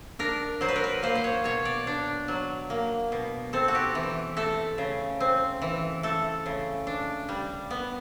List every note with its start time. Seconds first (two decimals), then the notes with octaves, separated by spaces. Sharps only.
0.19 D4 A#4
0.61 F#3 C5
0.68 B4
0.76 A#4
0.84 B4
1.03 A#3 C5
1.15 C5
1.24 C#5
1.44 B2 C#5
1.65 D5
1.87 D4
2.28 F#3
2.70 A#3
3.12 B2
3.53 C4 A4
3.68 F#4
3.75 G4
3.95 E3
4.37 A3 A4
4.78 C#3
5.20 C4
5.62 E3
6.03 A3 A4
6.46 C#3
6.87 D4
7.29 G3
7.70 B3